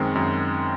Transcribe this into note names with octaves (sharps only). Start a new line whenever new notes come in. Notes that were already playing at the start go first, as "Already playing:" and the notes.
Already playing: F#2 D#3 G#3 C4
F#2